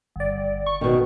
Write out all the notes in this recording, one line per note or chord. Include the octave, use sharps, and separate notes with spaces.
G1 D5
C#6
B2 D#3